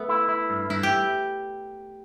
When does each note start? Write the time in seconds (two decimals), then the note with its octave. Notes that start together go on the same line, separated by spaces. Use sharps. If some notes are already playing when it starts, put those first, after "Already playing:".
Already playing: A3 B3
0.09 E4
0.29 E4
0.50 G2
0.70 G2 E4
0.83 G4